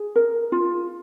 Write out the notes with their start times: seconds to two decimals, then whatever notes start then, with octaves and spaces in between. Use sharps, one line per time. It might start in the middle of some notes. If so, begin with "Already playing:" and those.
Already playing: G#4
0.16 A#4
0.52 F4